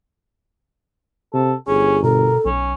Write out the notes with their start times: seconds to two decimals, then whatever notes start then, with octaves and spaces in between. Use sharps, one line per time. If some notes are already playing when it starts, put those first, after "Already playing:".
1.34 C3 A4
1.67 G1 C#4 G#4
2.04 B2 A4 A#4
2.45 B1 C#4